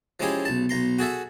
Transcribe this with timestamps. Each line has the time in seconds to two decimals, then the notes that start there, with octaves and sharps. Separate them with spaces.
0.20 F3 G#3 C#4 E4 G4 G#4
0.45 B1 A5
0.69 B1 A#5 C6
0.99 F#4 G#4 A4 E5